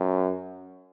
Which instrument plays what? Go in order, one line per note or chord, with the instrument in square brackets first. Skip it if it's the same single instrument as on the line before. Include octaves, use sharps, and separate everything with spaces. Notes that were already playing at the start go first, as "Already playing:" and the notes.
Already playing: [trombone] F#2